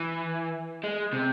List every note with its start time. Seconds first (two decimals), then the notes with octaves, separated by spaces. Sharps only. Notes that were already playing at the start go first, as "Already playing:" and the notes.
Already playing: E3
0.84 G#3
1.13 C3